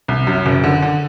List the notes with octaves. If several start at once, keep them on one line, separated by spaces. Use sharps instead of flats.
C2
F#2
F#1
D3
D3